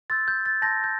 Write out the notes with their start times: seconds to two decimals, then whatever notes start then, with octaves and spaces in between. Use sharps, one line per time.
0.10 C6 E6 G6 A6
0.28 G6
0.46 A6
0.62 A5 C6 E6 G6 A#6
0.84 G6